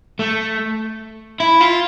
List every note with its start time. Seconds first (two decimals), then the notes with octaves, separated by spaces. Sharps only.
0.19 A3
1.40 E4
1.61 F4